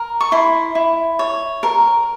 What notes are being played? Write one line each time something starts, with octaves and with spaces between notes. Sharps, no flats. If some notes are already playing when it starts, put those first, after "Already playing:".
Already playing: A#4
C#6
E4 C6
E4
C#5
A#4